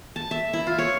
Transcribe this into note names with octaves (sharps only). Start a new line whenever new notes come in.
A5
E5
E4
F4
C#5